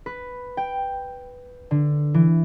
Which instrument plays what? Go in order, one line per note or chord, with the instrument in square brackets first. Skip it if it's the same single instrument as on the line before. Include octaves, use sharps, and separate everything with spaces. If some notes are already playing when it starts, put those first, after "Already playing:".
[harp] B4
G5
D3
E3